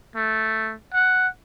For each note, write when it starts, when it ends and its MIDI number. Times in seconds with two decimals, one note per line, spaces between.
0.16 0.74 57
0.93 1.28 78